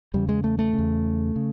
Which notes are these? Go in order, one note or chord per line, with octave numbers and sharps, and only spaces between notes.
E2 C#3 G3
G#3
A3
A3
C#3
E2
C#3